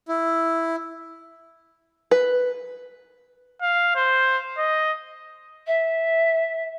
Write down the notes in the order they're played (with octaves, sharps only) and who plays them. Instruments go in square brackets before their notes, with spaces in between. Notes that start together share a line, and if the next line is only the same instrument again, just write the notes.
[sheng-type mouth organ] E4
[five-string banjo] B4
[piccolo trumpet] F5
C5
D#5
[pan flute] E5